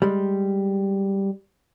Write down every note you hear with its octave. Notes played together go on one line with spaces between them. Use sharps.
G3 G#3